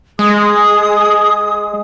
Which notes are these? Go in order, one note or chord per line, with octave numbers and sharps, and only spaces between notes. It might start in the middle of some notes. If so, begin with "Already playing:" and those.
G#3 G#4 D#6